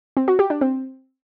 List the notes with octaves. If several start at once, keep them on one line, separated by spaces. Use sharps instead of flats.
C4
F#4
G4
D4
C4